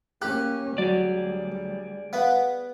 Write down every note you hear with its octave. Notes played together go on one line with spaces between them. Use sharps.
A#3 C#4 G4 F#6
D2 F#3 G3 G#4 D5
B3 F5 F#5